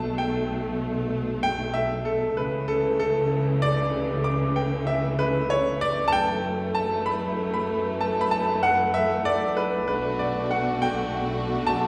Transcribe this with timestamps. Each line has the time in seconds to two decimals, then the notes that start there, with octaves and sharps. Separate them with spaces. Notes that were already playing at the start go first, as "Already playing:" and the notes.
Already playing: B1 B2 A3 A5
0.18 G5
1.43 G5
1.74 E5
2.05 A4
2.37 C#2 C#3 E3 A3 B4
2.68 A4
3.00 A4
3.62 D5
4.24 D6
4.56 G5
4.87 E5
5.19 B4
5.50 C#5
5.81 D5
6.08 A5
6.12 F#2 E3 A3 G5
6.75 A5
7.06 B5
7.54 B5
8.01 A5
8.21 B5
8.31 A5
8.63 F#5
8.94 E5
9.25 D5
9.57 B4
9.88 B1 B2 A3 D4 F#4 B4
10.19 D5
10.51 F#5
10.82 G5
11.67 A5